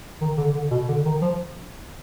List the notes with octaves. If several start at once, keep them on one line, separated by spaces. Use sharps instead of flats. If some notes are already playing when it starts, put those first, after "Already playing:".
D#3
D3
D3
B2
D3
D#3
F3